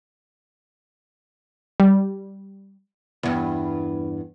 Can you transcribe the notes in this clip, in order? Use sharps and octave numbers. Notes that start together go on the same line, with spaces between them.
G3
E2 G2